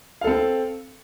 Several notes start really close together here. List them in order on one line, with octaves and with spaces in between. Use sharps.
F5 A4 C4